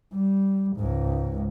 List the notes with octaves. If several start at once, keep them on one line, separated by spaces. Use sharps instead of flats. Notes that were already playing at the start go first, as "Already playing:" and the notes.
G3
C#2 G#2